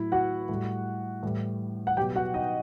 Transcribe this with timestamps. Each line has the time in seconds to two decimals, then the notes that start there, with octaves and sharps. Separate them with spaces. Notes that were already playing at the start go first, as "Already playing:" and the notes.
Already playing: A2 F#3 E4
0.12 F#4 F#5
0.49 A2 G3
1.23 A2 E3 G3
1.87 F#5
1.97 B2 F#3 G4 G5
2.16 F#4 F#5
2.34 D#4 D#5